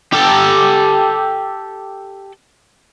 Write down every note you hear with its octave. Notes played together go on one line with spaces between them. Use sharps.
G4 A4